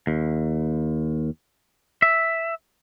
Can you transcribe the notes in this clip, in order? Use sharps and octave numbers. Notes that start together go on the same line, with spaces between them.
D#2
E5